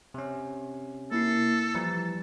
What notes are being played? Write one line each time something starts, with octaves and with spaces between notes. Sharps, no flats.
C3 C#4
A#3 E4 A4 C7
E3 F3 G3 A#5 A6